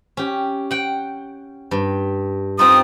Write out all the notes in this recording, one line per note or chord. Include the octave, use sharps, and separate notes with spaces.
C#4 G4
F#5 G5
G2
C4 D#4 F4 D#6